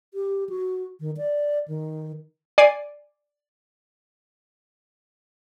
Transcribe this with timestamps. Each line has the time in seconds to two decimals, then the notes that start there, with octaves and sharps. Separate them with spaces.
0.14 G4
0.49 F#4
1.00 D#3
1.17 D5
1.68 D#3
2.58 D5 G#5 C7 D#7